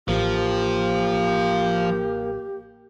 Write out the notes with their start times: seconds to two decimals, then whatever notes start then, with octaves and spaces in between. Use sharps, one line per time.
0.08 A1 F3 A#3 G4